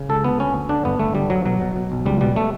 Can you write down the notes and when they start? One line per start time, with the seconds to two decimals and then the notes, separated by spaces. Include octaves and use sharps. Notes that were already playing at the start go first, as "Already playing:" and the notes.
Already playing: C#3
0.09 C#2 A4
0.24 D2 B3
0.39 D2 C#4
0.54 D2
0.69 D3 D4
0.85 G1 B3
0.99 G1 A3
1.15 D3 G3
1.30 G2 F#3
1.45 B2 F#3
1.61 B2
1.76 B2
1.92 B1
2.06 C#2 G3
2.21 B2 G3
2.36 B2 A3